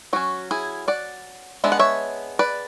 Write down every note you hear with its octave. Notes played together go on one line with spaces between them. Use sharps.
F#3 C#4 F#4
E4 G#4
D5 F#5
G#3 B3 D4 E5
F#5
C#5 E5
B4 D5